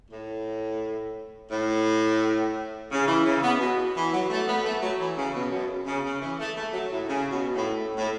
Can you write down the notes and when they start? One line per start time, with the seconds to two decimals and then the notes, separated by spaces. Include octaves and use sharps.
0.11 A2
1.50 A2
2.91 C#3
3.07 E3
3.26 C#3
3.43 B3
3.60 B2
3.96 E3
4.12 F#3
4.30 A3
4.47 B3
4.64 A3
4.82 F#3
5.00 E3
5.17 C#3
5.35 B2
5.51 F#2
5.86 C#3
6.05 C#3
6.21 E3
6.39 A3
6.56 A3
6.73 F#3
6.91 A2
7.09 C#3
7.32 B2
7.55 A2
7.96 A2